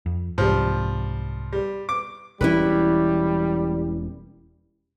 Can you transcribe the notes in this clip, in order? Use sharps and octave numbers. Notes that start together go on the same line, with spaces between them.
F2
C2 G#2 F3 G3
G3
D6
E1 E3 G3 C#4 E4 F#4 B4